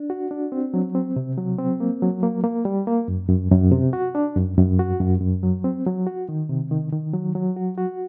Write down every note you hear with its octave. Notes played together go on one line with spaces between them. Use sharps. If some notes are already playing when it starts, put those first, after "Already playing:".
Already playing: D4
F#4
D4
C4
F#3
C4
C3
F#3
C4
A#3
F#3
A#3
A#3
G3
A#3
F#2
F#2
F#2
C3
F#4
D4
F#2
F#2
F#4
F#2
F#2
F#3
C4
F#3
F#4
D#3
C3
D#3
D#3
F#3
F#3
F#4
F#4